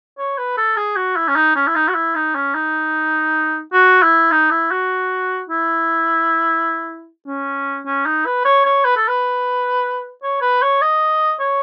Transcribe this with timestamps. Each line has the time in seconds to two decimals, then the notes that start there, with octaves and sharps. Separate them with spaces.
0.18 C#5
0.38 B4
0.57 A4
0.77 G#4
0.96 F#4
1.16 E4
1.28 C#4
1.36 D#4
1.56 C#4
1.67 E4
1.76 D#4
1.88 F#4
1.95 E4
2.15 D#4
2.35 C#4
2.55 D#4
3.73 F#4
4.03 E4
4.32 D#4
4.51 E4
4.71 F#4
5.49 E4
7.27 C#4
7.86 C#4
8.06 D#4
8.26 B4
8.45 C#5
8.65 C#5
8.85 B4
8.97 A4
9.08 B4
10.23 C#5
10.42 B4
10.62 C#5
10.82 D#5
11.40 C#5